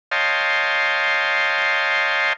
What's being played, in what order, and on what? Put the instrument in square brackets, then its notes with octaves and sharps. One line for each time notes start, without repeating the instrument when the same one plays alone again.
[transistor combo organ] C#5 D#5 F5 G5 A5 C6